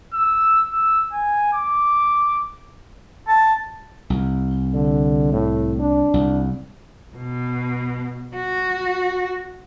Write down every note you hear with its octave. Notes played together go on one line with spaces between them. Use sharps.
E6
E6
G#5
D6
A5
C2
D3
A2
D4
C2
B2
F#4